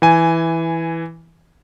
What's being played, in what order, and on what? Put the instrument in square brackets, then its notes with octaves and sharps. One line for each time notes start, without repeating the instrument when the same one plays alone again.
[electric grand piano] E3 G#5